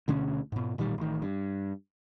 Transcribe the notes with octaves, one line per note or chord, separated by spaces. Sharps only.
D2 B2 D3 C#4
G#2 B2
A1 A#2 D#3 G3
A1 D#3
G2